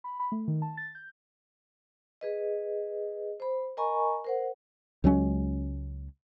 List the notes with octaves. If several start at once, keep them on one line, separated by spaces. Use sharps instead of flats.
B5
B5
A3
D#3
A5
A6
G6
G#4 B4 D#5
C5 B5
A#4 D#5 G#5 A#5 B5 C#6
A#4 C5 F#5
C#2 F#3 G#3 C#4